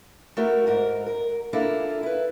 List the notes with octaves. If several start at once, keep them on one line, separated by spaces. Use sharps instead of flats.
A3 A#3 E4 F#4 A#4
G#2 A#4
A#4
A#3 D4 E4 F4 A4 A#4
E4 B4